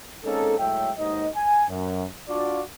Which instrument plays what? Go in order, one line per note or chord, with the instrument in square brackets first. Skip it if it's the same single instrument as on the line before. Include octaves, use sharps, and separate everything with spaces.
[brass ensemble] G#3 A#3 C4 C#4 D#4 A4
A2 F#3 G#3 A4 E5 G5
D#2 G#2 D#4 D#5
G#5
F#2
D4 F4 F#4 D5